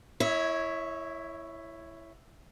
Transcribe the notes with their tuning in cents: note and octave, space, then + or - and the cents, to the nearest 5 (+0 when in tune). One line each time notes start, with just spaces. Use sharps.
E4 +10 C#5 +0 E5 -45